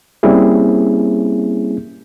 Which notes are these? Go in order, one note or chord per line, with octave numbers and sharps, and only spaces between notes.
G3 A#3 C4 C#4 E4 G#4